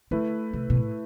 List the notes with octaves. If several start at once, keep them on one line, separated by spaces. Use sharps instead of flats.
D3 A3 E4 B4
C3
B2
A2